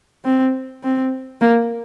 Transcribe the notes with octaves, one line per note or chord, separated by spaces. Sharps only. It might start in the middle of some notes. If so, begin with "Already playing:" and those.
C4
C4
A#3